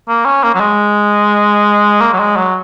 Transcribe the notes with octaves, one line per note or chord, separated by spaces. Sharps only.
A#3
C#4
A#3
F#3
G#3
A#3
F#3
G#3
F#3